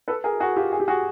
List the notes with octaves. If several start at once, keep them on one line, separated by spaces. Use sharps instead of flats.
A4 B4
G#4 A#4
F#4 G#4
F4 G4
G#4
G4
F#4 G#4